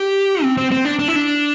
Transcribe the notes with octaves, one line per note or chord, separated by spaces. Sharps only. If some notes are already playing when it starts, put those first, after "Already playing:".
Already playing: G4
C4
C4
C4
D4
D4
E4
D4